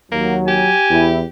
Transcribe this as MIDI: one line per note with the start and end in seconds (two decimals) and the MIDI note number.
0.12 0.63 39
0.12 0.71 54
0.12 0.36 58
0.48 1.28 67
0.48 1.06 80
0.90 1.24 40
0.90 1.17 64